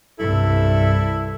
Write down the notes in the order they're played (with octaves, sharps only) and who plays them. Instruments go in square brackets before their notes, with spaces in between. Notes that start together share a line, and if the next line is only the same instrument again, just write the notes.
[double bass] C2 G2 [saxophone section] E4 A4